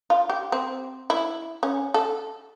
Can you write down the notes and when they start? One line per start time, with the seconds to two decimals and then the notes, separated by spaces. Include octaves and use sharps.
0.10 F4
0.30 G4
0.52 C4
1.10 E4
1.63 C#4
1.94 A4